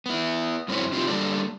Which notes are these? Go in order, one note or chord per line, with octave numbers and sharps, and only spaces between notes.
B3 E4
F#2 A#3 C4 C#4 E4 C#5
C3 C4 E4 F4 G4
G3 A#3 D4 A4 D5